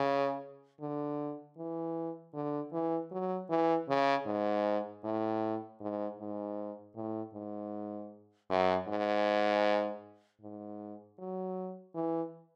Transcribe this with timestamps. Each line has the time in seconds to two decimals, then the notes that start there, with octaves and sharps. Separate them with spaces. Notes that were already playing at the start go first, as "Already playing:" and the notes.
Already playing: C#3
0.81 D3
1.58 E3
2.34 D3
2.72 E3
3.12 F#3
3.50 E3
3.89 C#3
4.26 G#2
5.04 A2
5.81 G#2
6.20 G#2
6.95 A2
7.34 G#2
8.50 F#2
8.88 G#2
10.41 G#2
11.19 F#3
11.95 E3